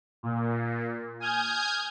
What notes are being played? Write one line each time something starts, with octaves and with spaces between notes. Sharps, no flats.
A#2
G#5 D#6 F6 G6 G#6